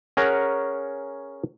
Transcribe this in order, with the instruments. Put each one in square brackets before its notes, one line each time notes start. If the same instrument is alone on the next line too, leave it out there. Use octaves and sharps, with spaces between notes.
[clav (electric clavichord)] C#4 G#4 A#4 C#5 F#5 A#5